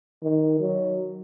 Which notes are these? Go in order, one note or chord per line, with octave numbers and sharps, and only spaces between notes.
D#3
F#3